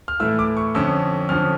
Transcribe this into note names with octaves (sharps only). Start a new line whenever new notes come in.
F6
A2 E3 A3 E4 E6
D6
C#6
F2 D3 F3 C#4 E6
F2 D3 F3 C#4 F6